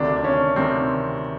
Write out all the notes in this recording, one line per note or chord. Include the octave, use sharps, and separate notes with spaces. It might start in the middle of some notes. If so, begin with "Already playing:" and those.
Already playing: D2 C3 D#3 D4
D4
C#4
C3 D#3 C4